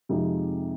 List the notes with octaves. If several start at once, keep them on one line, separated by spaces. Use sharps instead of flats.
F2 C3 F3 G#3 D#4